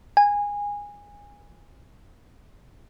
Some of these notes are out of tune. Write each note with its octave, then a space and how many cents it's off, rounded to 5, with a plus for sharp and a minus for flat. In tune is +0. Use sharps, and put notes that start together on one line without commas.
G#5 -20